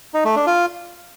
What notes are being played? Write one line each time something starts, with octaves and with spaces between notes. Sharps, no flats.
D#4
A3
D4
F4